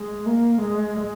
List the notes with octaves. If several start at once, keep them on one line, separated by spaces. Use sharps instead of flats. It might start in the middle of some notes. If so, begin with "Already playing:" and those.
Already playing: G#3
A#3
G#3